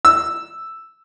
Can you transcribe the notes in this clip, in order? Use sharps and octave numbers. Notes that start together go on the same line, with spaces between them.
E6